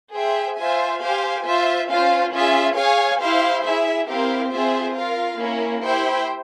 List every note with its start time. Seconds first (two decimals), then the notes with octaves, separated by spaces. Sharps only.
0.14 G#4 C5 E5 G5
0.57 F4 C5 E5 G#5
1.01 G4 C5 F5 G#5
1.45 F4 C5 E5
1.89 C#4 F4 C5 F5
2.32 C#4 F4 G#4 E5
2.76 G#4 C#5 F5 G#5
3.20 E4 G4 C5 F5
3.63 E4 G#4 E5
4.08 C4 E4 G4 A#4 F5
4.51 C4 F4 G#4 C5 E5
4.94 F4 A#4 F5
5.38 A#3 C#4 E4
5.82 E4 G4 C5 G5